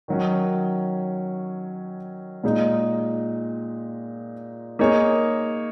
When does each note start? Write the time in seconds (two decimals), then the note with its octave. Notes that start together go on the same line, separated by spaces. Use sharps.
0.08 D#3 F#3 C#4
2.44 A#2 G#3 D#4
4.79 A#3 D#4 G#4 C#5